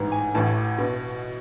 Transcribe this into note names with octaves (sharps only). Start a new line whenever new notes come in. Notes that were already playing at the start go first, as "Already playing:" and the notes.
Already playing: A1 G#2 E3
G#5
A1 A2 E3 A5
B2